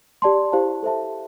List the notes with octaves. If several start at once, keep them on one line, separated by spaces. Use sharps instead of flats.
G4 D5 A5 C6
E4 G4 C5 F5 A5
A4 C5 E5 A5